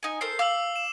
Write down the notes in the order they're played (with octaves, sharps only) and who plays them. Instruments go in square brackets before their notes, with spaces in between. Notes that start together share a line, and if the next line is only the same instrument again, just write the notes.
[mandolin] D#4 G#5
[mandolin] A4 A#4 C5 [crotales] C7
[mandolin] F5 [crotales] D6 E6 F#7
[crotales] E7